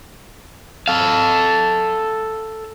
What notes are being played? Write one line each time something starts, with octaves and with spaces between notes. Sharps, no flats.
A4 F5